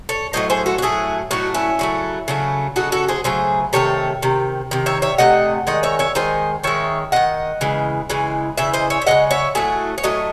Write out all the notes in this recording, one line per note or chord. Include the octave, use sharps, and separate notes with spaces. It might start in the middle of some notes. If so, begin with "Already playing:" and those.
A4 C#5
A2 F#3 A3 C5 D#5
G#4 C5
F#4 A4
F#4
A2 F#3 A3 E4 G#4
A2 F#3 A3 D#4 F#4
C#4 E4
C#3 F#3 A3
C#3 F#3 A3
C#3 F#3 A3 D#4 F#4
F#4 A4
G#4 C5
C#3 F#3 A3 G#4 C5
C3 D#3 A3 A4 C#5
C3 D#3
C3 D#3
C#5 E5
C#5 E5
C3 D#3 A3 D#5 F#5
D#3 G#3 D#5 F#5
C#5 E5
C#5 E5
D#3 G#3 C5 D#5
D#3 G#3 C#5 E5
D#3 G#3 D#5 F#5
C#3 E3 G#3
C#3 E3 G#3
C#3 E3 E5
C5 D#5
C#5 E5
E5
C#3 E3 G#3 D#5 F#5
C#5 E5
A2 F#3 A3 E4 G#4
C#5
A2 F#3 A3 D#5